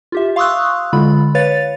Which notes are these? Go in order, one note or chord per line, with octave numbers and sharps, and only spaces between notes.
F4 G4 E5
F5 C6 C#6 D#6 E6 F#6
D3 G#3 F4 B5
B4 C#5 F5 A6